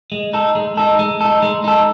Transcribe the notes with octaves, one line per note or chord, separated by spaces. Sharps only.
G#3
D#4 A4
G#3
D#4 A4
G#3
D#4 A4
G#3
D#4 A4